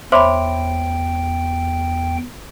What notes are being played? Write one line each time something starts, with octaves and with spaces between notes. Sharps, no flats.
E2 C5 C#5 E5 G5 B5 C6 D6